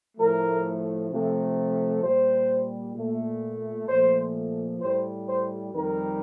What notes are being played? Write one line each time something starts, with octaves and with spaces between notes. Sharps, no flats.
A2 F3 A3 A#4
C3 F3 A3
A#2 G3 C5
A#2 A3
A#2 F3 A3 C5
A2 G3 C5
C5
F2 D#3 G3 A#4